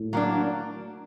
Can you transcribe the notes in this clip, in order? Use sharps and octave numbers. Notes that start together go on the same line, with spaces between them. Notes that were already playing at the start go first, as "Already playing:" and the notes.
Already playing: A2
F#3 A#3 D4